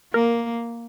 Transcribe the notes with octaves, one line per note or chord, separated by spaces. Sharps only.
A#3 A#4